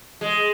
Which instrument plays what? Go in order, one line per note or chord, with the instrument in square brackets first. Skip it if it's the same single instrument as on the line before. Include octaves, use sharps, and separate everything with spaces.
[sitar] G#3